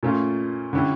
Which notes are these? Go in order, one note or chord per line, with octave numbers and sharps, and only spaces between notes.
A#2 A3 C#4 F4
D3 G3 C#4 E4